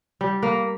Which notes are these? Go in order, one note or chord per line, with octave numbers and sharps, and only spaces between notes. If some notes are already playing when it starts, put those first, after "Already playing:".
G3
A#3